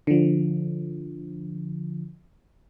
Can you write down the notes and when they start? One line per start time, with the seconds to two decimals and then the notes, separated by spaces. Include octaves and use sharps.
0.07 D3 F3